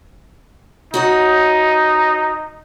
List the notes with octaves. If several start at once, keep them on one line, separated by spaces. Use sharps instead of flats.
D#4 F#4 C#5 F#5